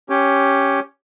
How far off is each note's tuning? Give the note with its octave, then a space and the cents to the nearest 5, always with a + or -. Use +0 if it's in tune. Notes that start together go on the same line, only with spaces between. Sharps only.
C#4 +0 G4 +0